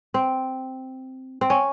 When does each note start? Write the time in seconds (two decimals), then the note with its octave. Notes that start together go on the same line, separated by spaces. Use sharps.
0.14 C4
1.41 C4
1.50 C#4